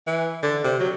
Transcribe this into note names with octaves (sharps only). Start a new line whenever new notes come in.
E3
D3
C3
F#3